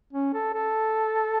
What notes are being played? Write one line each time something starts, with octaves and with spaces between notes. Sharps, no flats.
C#4
A4
A4